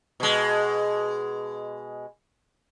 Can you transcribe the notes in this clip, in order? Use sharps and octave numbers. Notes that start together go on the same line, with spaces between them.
B2 G#3